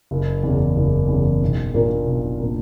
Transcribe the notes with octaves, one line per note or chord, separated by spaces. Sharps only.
F#1
E2 C#3
F#1
E2 C#3
B1
A#2 A#3 D4 A#4
B1
A#2 A#3 D4 A#4